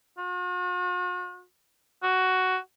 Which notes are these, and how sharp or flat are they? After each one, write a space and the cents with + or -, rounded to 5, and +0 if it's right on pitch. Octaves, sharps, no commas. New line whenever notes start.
F#4 -45
F#4 +10